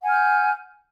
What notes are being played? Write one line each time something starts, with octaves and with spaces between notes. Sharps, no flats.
F#5 G#5 F6 G6